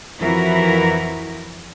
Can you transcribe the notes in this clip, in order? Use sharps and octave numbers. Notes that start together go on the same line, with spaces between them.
F2 E3 E4 F#4 A#4